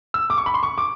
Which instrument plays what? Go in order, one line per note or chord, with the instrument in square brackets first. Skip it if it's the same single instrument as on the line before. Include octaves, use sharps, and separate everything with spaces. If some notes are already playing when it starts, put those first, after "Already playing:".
[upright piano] E6
D6
C#6
B5
C6
C#6
D6